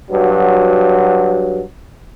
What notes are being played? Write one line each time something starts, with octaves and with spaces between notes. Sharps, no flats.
G2 F#3